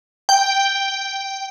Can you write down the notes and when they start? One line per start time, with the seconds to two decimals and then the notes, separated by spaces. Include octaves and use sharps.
0.29 G5